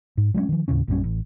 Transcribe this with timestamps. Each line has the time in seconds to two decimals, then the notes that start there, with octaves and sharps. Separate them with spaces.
0.17 G#2
0.34 F#3 G#3 A#3 C#4
0.49 D#3 F3
0.68 D#2 A2 C#3 C#4
0.88 A#1 F#2 G3 C#4
1.04 A1